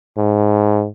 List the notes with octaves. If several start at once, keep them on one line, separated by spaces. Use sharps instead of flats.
G#2